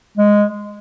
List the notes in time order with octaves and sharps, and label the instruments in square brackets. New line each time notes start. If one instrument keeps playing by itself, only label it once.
[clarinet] G#3